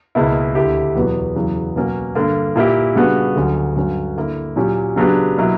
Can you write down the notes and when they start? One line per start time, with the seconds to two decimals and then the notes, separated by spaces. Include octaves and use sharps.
0.15 C#2 B2 A#3 E4
0.55 D2 D3 A#3 E4 G4
0.95 E2 B2 F#3 B3 F#4
1.35 E2 C#3 F#3
1.76 B2 F#3 A#3 C#4 F#4
2.15 G2 D3 A#3
2.56 A#2 A#3 E4 G4
2.95 C#3 G3 B3 D4 F#4
3.36 D2 D3 F#3 C#4 F#4
3.76 G2 D3 F#3 C#4 F#4
4.17 D3 A#3 E4
4.56 A#2 F#3 C#4 G4
4.96 C#3 F#3 B3 D4 G4
5.37 B2 F#3 A#3 E4